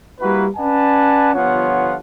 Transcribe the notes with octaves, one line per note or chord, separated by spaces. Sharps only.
G3 A#3 E4 F#4 B4
C#4 B4 D5 F#5 G#5 A5
G1 F3 B3 F4 C#5 F#5